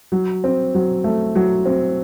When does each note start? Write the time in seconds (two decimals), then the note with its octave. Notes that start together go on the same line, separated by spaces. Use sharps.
0.12 F#3
0.44 C4
0.75 F#3
1.04 A3
1.35 F#3
1.65 C4